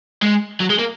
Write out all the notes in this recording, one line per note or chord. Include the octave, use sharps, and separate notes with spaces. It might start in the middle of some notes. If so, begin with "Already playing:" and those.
G#3
F#3
G#3
A#3